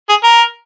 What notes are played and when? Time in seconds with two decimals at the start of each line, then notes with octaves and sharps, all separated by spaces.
0.09 G#4
0.24 A#4